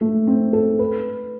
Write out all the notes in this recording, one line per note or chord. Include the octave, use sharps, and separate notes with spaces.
A3
C4
A4
B4